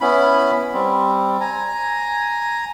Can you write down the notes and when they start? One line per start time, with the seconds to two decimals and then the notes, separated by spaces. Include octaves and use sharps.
0.01 B3 C#4 E4 B5
0.74 G3 C4
1.41 G#5 A#5